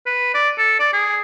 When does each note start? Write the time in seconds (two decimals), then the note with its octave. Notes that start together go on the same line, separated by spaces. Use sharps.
0.06 B4
0.34 D5
0.58 A4
0.79 D5
0.93 G#4